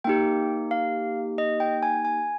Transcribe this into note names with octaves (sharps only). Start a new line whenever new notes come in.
A#3 D#4 G4 G5
F5
D#5
G5
G#5
G#5